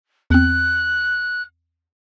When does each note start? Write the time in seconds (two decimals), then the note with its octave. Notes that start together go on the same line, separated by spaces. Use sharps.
0.30 E2 C4 F#6